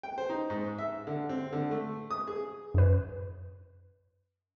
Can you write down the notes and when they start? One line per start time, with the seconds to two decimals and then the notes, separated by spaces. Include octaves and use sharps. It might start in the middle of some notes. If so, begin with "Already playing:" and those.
0.03 G5
0.18 C5
0.30 D#4
0.50 G#2
0.78 E5
1.07 D3
1.29 C4
1.53 D3
1.71 A3
2.11 D#6
2.27 G#4
2.74 F#2 B4